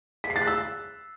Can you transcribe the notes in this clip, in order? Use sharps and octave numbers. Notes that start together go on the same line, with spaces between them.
B6
C7
A6
F#6
E6